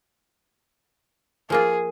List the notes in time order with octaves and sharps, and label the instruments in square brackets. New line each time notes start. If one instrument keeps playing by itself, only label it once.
[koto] F3 A#3 F4 [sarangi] G#4